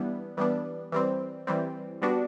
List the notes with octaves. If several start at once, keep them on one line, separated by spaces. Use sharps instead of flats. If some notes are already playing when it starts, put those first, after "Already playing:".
Already playing: E3 G3 B3 D4
E3 G3 B3 D4
E3 G3 C4
E3 G3 C4
G3 B3 D4 F#4